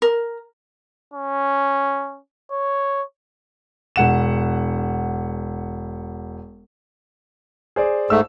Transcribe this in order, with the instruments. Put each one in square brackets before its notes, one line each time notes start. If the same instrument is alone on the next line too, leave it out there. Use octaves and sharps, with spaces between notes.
[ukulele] A#4
[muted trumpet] C#4
C#5
[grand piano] E1 F#5 E7
G#4 C5 D5
[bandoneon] G#2 A3 [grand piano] E6